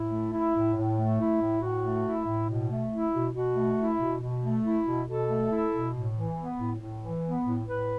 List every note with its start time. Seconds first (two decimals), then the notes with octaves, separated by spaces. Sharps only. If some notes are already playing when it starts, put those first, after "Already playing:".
Already playing: A2 E4
0.10 A3
0.32 E4
0.54 A2
0.75 A2
0.96 A3
1.18 E4
1.40 A2
1.61 A2 F#4
1.83 A3
2.05 E4
2.26 A2
2.48 B2
2.70 A3
2.91 E4
3.13 B2
3.34 B2 F#4
3.56 A3
3.78 E4
3.99 B2
4.20 B2
4.43 A3
4.64 E4
4.85 B2
5.07 B2 A4
5.29 A3
5.50 E4
5.72 B2
5.94 A2
6.16 E3
6.37 B3
6.59 A2
6.80 A2
7.02 E3
7.24 B3
7.45 A2
7.67 A2 B4